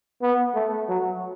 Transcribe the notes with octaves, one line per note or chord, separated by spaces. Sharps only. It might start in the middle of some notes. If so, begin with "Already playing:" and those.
B3
A3
F#3